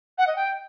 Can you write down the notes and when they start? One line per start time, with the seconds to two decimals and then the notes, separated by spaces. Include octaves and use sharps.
0.18 F#5
0.27 D#5
0.36 G5